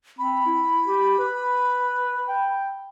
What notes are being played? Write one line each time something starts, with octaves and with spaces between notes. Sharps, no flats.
C4 B5
E4
G4
B4
G5